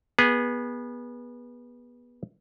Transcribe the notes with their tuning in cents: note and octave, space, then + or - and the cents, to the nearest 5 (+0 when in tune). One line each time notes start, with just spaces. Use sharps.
B3 -20 G#4 -15